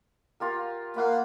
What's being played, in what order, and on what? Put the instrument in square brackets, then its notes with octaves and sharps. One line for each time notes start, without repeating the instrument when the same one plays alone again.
[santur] F4 G4 A#4
[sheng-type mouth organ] A#3 [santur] F5 F#5 B5